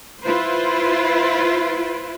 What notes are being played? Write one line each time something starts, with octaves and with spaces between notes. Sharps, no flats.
E4 F4 B4 C5